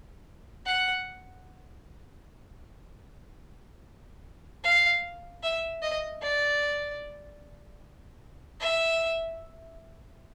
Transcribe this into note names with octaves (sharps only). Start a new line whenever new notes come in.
F#5
F5
E5
D#5
D5
E5